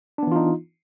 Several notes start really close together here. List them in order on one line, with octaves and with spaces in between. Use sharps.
D4 B3 E3 F4 D#4